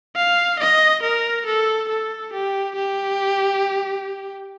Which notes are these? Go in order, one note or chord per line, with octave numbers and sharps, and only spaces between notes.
F5
D#5
A#4
A4
A4
G4
G4